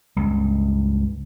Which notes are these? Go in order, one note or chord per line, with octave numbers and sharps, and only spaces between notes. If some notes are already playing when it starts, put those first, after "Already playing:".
C#2 G2